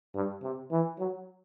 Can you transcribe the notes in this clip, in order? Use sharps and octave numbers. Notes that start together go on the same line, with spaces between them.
G2
C3
E3
F#3